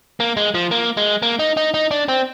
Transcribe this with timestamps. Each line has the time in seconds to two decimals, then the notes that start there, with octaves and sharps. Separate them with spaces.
0.20 A#3
0.37 G#3
0.54 F3
0.71 A#3
0.97 G#3
1.22 A#3
1.39 D#4
1.57 D#4
1.74 D#4
1.91 D4
2.08 C4